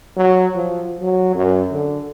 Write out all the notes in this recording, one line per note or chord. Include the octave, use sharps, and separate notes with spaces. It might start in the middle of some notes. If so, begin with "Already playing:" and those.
F#3
F3
F#3
F#2
D3